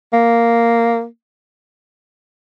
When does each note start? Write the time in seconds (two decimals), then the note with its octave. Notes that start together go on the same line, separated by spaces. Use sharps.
0.13 A#3